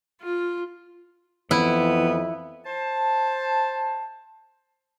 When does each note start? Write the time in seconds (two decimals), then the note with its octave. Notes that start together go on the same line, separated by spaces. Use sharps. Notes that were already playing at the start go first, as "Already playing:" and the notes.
0.21 F4
1.51 F2 E3 B3 E4
2.65 C5 A5